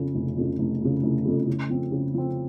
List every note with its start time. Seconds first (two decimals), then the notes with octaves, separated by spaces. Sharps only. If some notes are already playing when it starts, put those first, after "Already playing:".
Already playing: F2 C#3
0.14 F1
0.37 F2 C#3
0.59 F1
0.81 F2 C#3
1.03 F1
1.25 F2 C#3
1.48 C#3
1.69 F3 C4
1.92 C#3
2.14 F3 C4